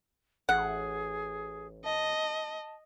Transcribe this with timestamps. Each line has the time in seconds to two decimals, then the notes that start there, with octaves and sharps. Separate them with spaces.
0.49 A1 G#4 F#5
1.84 D#5 A5